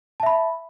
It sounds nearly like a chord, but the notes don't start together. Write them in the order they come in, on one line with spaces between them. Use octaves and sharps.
A5 E5 B5